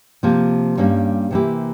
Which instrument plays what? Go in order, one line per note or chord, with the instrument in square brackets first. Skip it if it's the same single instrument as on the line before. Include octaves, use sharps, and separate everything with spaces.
[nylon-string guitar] C3 F3 A#3
G2 G3 A#3 C#4
C3 E3 A#3 E4 G4